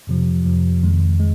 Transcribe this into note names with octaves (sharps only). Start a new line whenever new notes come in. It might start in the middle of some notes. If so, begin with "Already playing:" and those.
F2 C3 F3
F2 C3 F3
F2 D#3 G#3
G#3